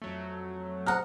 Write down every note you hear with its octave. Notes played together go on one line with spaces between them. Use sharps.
F2 F#3 A3
C5 D#5 F#5 A#5 F6